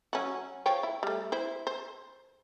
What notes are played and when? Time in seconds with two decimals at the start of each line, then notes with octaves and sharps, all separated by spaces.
0.13 F#3 C#4 F#4
0.66 F3 C#5 G5
0.83 E4
1.03 G3 A3
1.32 E4 C5
1.67 C5